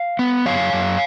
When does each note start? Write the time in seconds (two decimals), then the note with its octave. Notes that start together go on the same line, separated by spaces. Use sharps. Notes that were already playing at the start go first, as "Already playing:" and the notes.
Already playing: F5
0.19 B3
0.46 F#2 C#5 F5
0.73 F#2